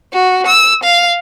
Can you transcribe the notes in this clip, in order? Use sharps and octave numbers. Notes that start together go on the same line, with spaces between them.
F#4
E6
F5